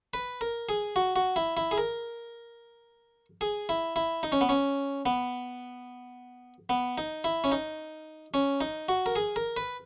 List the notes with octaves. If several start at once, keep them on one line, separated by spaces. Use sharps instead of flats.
B4
A#4
G#4
F#4
F#4
E4
E4
G#4
A#4
G#4
E4
E4
D#4
C#4
B3
C#4
B3
B3
D#4
E4
C#4
D#4
C#4
D#4
F#4
A#4
G#4
A#4
B4